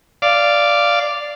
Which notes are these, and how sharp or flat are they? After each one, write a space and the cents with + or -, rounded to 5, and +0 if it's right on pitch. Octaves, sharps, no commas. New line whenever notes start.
D5 +0 F5 -15